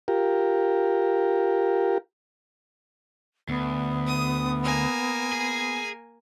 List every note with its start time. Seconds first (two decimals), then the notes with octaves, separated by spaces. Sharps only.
0.08 F4 G4 A#4
3.49 D2 B3
4.07 D#6
4.63 A#3 G#5
5.32 G#4